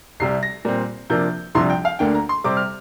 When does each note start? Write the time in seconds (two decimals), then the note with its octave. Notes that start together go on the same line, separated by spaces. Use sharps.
0.20 C2 C3 G3 C7
0.43 A#6
0.65 A#2 G3 C4
1.10 C3 F3 A#3 D4 G6
1.55 C2 C3 F3 D4 C6
1.70 G5
1.85 F5
1.99 D2 D3 A#3 G5
2.15 A#5
2.29 C6
2.44 C3 G3 C4 D6
2.57 F6